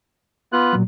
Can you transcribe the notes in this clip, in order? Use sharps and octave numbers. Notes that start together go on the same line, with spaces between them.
B3 F4 F#6
A#2 F#3